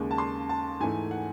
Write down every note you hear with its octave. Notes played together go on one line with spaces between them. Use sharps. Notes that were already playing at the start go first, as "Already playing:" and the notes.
Already playing: D#2 C#3 G#3
A5
C6
A5
G#2 E3 A3 G#5
F#5